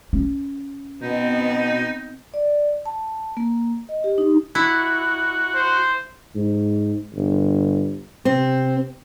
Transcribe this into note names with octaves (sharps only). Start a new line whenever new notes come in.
C#4
B2 B3 C4 D#4
D5
A5
A#3
D#5
G4
D#4
E4 F#4
C5
G#2
G1
C3 C4